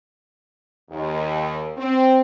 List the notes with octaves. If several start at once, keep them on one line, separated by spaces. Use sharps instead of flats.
D#2
C4